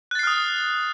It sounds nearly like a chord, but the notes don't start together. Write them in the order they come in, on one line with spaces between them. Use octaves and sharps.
F#6 A6 C7 F6 D#6